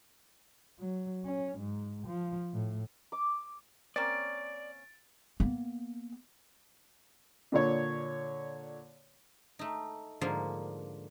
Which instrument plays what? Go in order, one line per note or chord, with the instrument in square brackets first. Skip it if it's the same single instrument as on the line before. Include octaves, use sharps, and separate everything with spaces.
[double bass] F#3
C#4
G#2
F3
A2
[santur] D6
[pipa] A#3 C4 C#4 [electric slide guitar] D5 [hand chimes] A6 D7
[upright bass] A#3 B3
[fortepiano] A#2 D3 C#5
[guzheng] A3 D#4
G#2 D3 F3 A#3